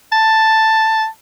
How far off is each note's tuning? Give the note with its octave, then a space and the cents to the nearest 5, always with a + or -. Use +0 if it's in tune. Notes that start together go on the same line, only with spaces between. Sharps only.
A5 +5